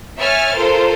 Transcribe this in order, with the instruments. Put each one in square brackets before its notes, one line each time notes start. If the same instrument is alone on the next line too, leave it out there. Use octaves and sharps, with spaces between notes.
[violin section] C#5 E5 G#5 F6 A6
F4 A4 A#4 C5